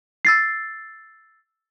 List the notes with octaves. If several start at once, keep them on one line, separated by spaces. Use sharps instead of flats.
E6 A6 C7